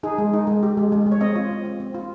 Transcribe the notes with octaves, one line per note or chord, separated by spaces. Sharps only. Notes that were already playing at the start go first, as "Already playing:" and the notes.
D#4 G#4
G#3
D#4
G#3
G4
G#3
G#3
G#3
C#5
C4 D#5
F4
C4
C4
C4
F4